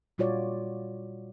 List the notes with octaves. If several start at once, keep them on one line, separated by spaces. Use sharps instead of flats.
A#2 G3 F4 F#4 C#5 D5